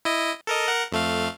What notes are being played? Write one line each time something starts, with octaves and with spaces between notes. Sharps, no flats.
E4 D#5
A4 A#4 D#5
A#4 F#5
F2 A3 F5